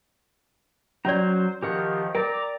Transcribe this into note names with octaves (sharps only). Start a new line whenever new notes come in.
F#3 C#4 C5 D5 A#5
D#3 F3 G4 A#4 F#5
A#4 D5 G5 A#5 D6